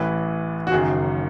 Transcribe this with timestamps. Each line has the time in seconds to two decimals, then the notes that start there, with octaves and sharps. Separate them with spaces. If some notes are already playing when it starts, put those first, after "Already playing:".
Already playing: A1 A2 E3 B4
0.67 F#4
0.71 F#1 F#2 D#3 G#4